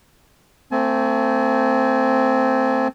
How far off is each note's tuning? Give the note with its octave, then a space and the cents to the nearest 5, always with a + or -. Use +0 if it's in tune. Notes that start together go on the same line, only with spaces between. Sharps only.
A3 +35 C4 +0 G#5 +35